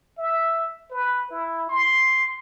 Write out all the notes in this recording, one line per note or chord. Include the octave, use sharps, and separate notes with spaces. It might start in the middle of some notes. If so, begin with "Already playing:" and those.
E5
B4
E4
C6